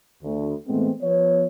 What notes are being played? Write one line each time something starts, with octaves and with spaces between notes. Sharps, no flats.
D2
A2 E3 G#3 A3 B3 C4
F3 B3 C#5